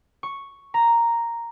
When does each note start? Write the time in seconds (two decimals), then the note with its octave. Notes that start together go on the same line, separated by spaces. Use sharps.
0.23 C#6
0.74 A#5